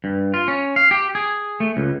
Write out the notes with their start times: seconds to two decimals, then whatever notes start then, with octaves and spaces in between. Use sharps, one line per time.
0.04 G2
0.34 F4
0.48 C#4
0.76 F5
0.91 G4
1.15 G#4
1.60 A3
1.77 C#2